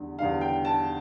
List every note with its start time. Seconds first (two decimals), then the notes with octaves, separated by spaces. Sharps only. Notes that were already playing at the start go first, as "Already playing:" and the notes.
Already playing: E2 D3 G3
0.19 E2 D3 G3 F5
0.41 G5
0.65 A5